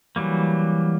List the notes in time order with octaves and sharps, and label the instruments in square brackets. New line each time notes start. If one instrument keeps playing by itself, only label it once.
[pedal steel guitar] E3 F#3 G3 A#3